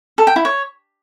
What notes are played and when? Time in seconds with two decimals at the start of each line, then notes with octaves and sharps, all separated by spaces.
0.18 A4
0.27 G5
0.36 E4
0.45 C#5